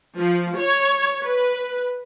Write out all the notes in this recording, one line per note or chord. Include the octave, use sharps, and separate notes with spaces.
F3
C#5
B4